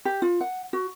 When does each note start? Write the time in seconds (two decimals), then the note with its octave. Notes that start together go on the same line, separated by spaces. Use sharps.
0.05 G4
0.22 F4
0.41 F#5
0.73 F#4